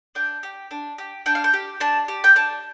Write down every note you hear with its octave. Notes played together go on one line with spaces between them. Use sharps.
D4 G5
G4
D4
G4
D4 G5
F5
G5
G4
D4 A5
G4
G5
D4 A5